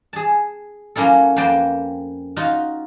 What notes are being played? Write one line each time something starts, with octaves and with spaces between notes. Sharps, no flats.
G#4 A5
F#3 A#3 C#4 E4 A4
F2 A#3 B4 G5 A5
D#4 F4 F#4